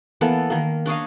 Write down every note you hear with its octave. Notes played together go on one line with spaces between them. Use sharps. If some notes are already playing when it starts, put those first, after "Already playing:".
E3 A#3 B3 A4
D#3 A#3
D4 C#5 D#5 F5